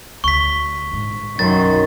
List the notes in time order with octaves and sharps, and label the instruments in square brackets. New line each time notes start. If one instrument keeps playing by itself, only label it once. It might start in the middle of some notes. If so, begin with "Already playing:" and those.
[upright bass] D2 [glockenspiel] C#6 B6
[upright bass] A#1 G#2
[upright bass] B1 [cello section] F#2 [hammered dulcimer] D#3 C6 [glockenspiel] A6